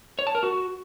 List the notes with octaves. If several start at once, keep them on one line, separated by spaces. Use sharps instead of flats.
C#5
A5
A#4
F#4